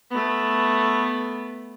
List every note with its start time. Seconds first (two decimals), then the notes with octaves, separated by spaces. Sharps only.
0.11 A3 B3